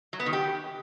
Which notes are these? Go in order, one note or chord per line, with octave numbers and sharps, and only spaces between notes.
F#3
B3
D#3
G4